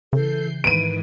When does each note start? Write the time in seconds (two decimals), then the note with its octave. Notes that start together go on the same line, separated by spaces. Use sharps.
0.13 C#3 E3 A4 G6 C7
0.64 G#2 D#3 E3 B4 D7 D#7